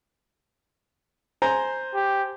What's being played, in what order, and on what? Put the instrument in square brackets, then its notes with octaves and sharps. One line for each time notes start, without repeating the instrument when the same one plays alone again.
[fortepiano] C5 G#5 A#5
[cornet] G4